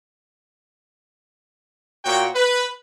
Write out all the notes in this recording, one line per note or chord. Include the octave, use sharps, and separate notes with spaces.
A#2 F#4 C#5 G5
B4